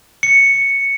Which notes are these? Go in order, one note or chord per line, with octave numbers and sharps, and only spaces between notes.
C#7